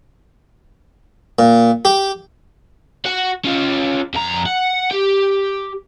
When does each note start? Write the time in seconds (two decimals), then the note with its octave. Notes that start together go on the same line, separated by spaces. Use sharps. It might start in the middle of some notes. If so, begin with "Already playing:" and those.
1.39 A#2
1.85 G4
3.05 F#4 F#5
3.45 C#4 F4
4.14 F2 A#5
4.46 F#5
4.91 G4